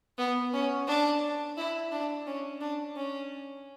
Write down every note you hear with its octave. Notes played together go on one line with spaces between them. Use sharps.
B3
C#4
D4
E4
D4
C#4
D4
C#4